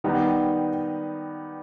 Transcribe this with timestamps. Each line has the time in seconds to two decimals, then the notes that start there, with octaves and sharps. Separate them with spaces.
0.04 D#3 G3 B3 D#4